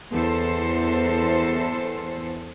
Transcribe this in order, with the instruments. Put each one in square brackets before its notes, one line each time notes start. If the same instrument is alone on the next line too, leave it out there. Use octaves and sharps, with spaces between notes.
[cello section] E2 A4 C5